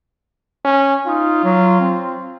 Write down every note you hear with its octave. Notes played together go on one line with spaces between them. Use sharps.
C#4
D#4 F4
F#3
C4